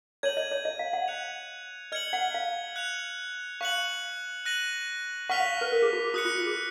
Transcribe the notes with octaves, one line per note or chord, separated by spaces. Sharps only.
C#5 G#6 D#7 F#7
D#5
C#5
D#5
F5
F#5
F#6 C#7 F7
D#5 F6 G#6 C#7 F#7
F#5
F5
F#6 C#7 F7
F5 C#6 F#6 C#7 F#7
F#6 A#6 D#7 F#7
F#5 C#6 F6 B6 F7
F5
B4
A#4
G#4
F#4
G#4
F#4 D#6 F#6 C#7
F4
F#4
G#4